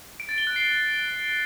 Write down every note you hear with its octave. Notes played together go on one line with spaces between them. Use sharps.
D7
A6
G7
F#6
C7